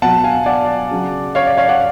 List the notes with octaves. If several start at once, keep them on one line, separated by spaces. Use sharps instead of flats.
B2 F#3 F#5 A5
F5 G#5
D5 F#5
C#3 F#3
C#5 F5
D5
C#5 F5
D5 F#5